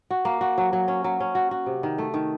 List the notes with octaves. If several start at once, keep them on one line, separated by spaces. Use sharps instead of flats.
F#4
A#3
F#4
F#3
F#3
C#4
F#3
C#4
F#4
F#4
C3
D#3
A3
D#3